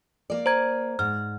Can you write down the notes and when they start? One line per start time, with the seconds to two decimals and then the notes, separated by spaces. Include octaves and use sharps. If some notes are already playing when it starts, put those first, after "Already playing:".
0.30 A#3 D5
0.46 C5 A#5 G#6
0.99 G#2 F6